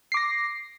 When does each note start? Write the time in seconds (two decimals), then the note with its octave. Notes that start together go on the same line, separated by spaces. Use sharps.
0.12 C7
0.14 D6
0.17 A#6